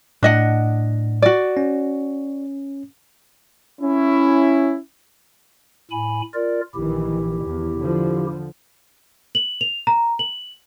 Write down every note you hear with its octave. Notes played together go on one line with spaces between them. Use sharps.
A2 D4 D#5 F#5
F#4 D5
C#4
C#4 E4
A2 G#5 B5
F4 A#4 D5
A#1 D#3 E3 E4 G4
E2
D3 F3
F#7
F7
A#5
F#7